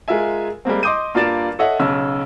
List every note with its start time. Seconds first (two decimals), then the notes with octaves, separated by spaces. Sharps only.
0.08 G#3 F4 A#4 E5 G#5
0.65 G3 G#3 A#3 C4
0.83 D#5 C6 D6 D#6 G6 D#7
1.15 G2 A#3 F4 D5 A6 E7
1.59 A4 C#5 D#5 E5 F#5
1.79 B1 C#3 C#4 E6